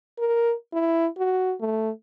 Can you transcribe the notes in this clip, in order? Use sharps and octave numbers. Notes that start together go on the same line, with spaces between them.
A#4
E4
F#4
A3